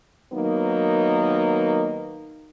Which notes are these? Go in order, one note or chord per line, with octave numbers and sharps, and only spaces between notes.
D#3 F#3 A#3 B3 D#4